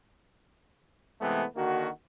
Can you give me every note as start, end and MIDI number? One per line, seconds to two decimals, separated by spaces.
1.21 1.44 48
1.21 1.44 52
1.21 1.44 56
1.21 1.44 57
1.21 1.44 59
1.56 1.89 50
1.56 1.89 51
1.56 1.89 58
1.56 1.89 66